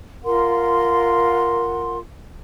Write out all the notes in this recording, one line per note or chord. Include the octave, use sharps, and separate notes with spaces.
F4 A#4 F#5 C6